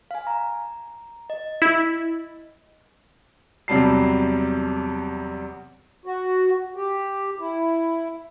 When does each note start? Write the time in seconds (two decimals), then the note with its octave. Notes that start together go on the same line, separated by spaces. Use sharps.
0.11 F5 G#5
0.27 A#5
1.30 D#5
1.62 E4
3.68 E2 C3 F#3 G3 A5 C7
6.06 F#4
6.76 G4
7.39 E4